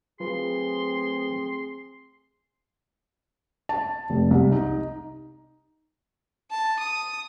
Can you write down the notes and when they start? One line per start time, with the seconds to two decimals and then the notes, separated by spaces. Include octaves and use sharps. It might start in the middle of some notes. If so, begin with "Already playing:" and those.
0.20 F#3 A3 C4 F4 G#4 B4 C6
3.69 A5
4.10 F1
4.31 C2
4.52 D#4
6.50 A5
6.79 D#6